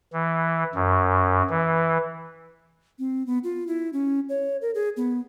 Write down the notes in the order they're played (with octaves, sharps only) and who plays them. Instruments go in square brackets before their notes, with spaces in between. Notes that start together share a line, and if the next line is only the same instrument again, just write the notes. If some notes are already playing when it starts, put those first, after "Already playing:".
[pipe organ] E3
F#2
E3
[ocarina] C4
B3
F4
E4
C#4
C#5
A#4
G#4
B3